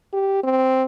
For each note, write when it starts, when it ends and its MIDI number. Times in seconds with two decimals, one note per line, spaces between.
0.13 0.40 67
0.43 0.84 60